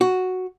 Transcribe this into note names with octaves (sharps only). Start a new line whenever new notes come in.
F#4